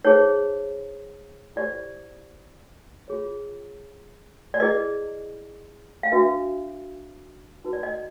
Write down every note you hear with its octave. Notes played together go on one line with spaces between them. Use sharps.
D#4 G#4 C5 C#5
E4 G4 C5 D5
F4 G#4 C#5
D5
E4 G#4 B4 D#5
F5
D4 F#4 B4 E5
D#4 F#4 B4
D5
D#5